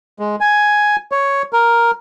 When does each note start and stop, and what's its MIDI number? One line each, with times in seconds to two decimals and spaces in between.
0.19 0.36 56
0.41 0.96 80
1.12 1.42 73
1.53 1.91 70